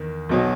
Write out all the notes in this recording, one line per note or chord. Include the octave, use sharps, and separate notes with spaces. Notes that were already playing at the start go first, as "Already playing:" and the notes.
Already playing: E2 D#3
B1 B2 F#3